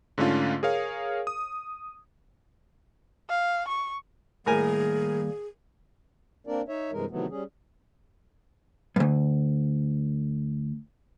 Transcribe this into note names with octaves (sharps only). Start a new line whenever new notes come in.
G#2 D3 A3 C#4 F4
G#4 A#4 C#5 F5
D#6
F5
C#6
A2 D#3 G3 A#3 G#4 A#4 G#5
A#3 C4 D4 A#4 D5
D#4 C#5 E5
G2 C3 E3 G#3 A#4
C3 D#3 E3 F#3 A3 B3
G3 C#4 G#4
D2 G2